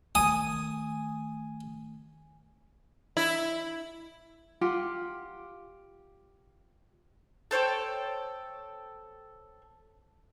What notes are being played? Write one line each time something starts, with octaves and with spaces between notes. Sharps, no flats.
D#3 A3 G#5 D#6
E4
F4 G4 F#5
A4 C5 C#5 G5